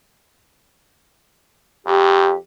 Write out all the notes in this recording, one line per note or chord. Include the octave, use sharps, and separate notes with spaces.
F2 G4